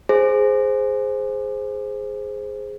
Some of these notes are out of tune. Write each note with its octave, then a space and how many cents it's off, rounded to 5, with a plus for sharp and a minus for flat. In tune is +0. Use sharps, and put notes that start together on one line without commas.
G#4 +0 C5 +0